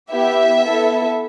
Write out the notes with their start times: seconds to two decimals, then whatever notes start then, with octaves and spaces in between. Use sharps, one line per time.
0.10 B3 E4 G4 E5
0.64 B3 E4 A4